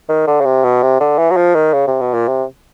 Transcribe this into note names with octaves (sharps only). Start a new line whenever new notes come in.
D#3
D3
C#3
C3
B2
C3
D3
E3
F#3
F3
D#3
C#3
C3
B2
A#2
C3